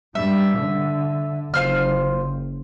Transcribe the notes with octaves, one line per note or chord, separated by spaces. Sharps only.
G2 G3 E5
D3
F#1 F4 C5 F6